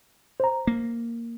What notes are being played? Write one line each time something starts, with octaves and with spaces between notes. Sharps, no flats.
C5 A#5
A#3